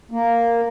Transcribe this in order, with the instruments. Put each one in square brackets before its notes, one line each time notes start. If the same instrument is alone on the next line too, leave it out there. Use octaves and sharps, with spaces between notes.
[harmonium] A#3